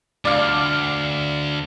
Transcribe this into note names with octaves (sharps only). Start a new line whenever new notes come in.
D2 D5 F5